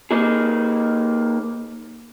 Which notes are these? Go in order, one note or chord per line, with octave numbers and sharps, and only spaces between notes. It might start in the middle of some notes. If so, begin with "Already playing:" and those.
A#3 D#4 G#4